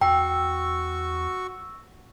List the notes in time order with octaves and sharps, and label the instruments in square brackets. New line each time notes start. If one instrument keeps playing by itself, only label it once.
[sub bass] E2 [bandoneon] F#4 C#6 [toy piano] G5 [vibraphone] E6